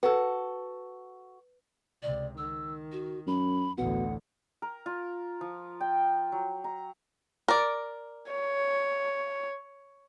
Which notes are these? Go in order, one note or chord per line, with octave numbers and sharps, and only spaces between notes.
F#4 A4 B4
C#2 C3 D5
D#3 E6
F#4
F#2 B5
A1 D2 B2 F#5
A#4
F4
F3
G5
F#3
A#5
A#4 D5
C#5